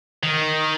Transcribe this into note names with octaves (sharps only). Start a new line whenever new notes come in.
D#3